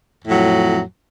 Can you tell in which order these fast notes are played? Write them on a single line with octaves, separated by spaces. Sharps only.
F2 A2 F#3